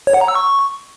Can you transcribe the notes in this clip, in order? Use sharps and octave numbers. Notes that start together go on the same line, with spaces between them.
C#5
F#5
A#5
E6
C#6